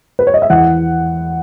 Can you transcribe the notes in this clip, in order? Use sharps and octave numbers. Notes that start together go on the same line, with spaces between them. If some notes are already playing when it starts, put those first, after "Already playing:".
B4
C#5
D#5
E5
E2 F#5